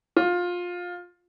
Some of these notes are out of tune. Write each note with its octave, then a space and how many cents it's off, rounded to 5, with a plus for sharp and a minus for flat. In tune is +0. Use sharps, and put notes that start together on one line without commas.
F4 +20